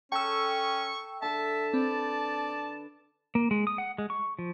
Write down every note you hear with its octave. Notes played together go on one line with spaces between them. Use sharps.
C#4 A4 G5 C#6 E6
D3 E5 F#5 A5
C4 B4 D5
A#3
G#3
D#6
F#5
G#3
C#6
F3